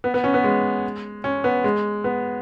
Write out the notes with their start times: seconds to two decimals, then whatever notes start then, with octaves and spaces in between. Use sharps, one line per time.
0.04 B3
0.14 B3
0.24 C#4
0.34 B3
0.44 G#3
1.24 C#4
1.44 B3
1.64 G#3
2.04 B3